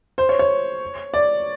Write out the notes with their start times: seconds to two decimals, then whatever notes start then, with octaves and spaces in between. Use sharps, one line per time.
0.18 C5
0.29 C#5
0.39 C#5
1.14 D5